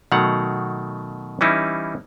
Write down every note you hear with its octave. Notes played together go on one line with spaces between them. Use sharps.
B2 D#3 F#3 A3 F5 F#5
E3 G3 C#4 D#4 E4